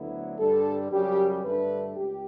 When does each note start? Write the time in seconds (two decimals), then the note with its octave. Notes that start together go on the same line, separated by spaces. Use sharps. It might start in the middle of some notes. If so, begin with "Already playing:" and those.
Already playing: D2 D3 F#3 B3 E4
0.39 G2 D3 G3 D4 A4
0.92 F#2 C#3 G3 G4
1.44 G2 D3 A3 D4 B4
1.96 C#2 G4